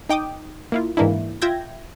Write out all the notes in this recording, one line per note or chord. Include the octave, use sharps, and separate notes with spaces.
D#4 G5 D6 D#6
A#3 E4 F4
G#2 E3 A#3 D4 E4
F4 E5 G5 G6 G#6 A#6